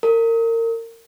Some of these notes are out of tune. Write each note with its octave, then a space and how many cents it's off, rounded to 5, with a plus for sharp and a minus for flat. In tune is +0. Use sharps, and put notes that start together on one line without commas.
A#4 -30